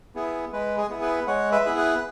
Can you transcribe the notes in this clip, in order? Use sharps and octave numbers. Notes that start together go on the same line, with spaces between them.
B3 E4 G#4
G#3 B4
G#4
B3 E4 G#4
B4
G#3 C#5 F#5
B4 E5
B3 E4 G#4
B4